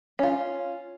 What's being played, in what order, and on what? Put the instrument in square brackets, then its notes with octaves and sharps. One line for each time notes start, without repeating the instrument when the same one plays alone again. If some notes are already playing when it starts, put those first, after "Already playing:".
[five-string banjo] C#4 F4